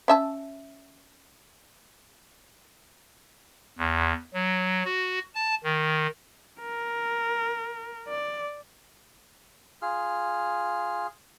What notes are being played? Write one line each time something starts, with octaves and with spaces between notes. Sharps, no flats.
C#4 E5 A5
E2
F#3
F#4
A5
D#3
A#4
D5
F4 G#4 F6